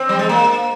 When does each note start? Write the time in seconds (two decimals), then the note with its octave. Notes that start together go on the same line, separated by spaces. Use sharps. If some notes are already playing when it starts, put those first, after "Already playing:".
Already playing: C4
0.09 G3
0.19 G#3
0.29 A#3